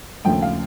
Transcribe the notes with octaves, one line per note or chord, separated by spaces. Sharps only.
D#2 C#3 F3 A3 G5
F5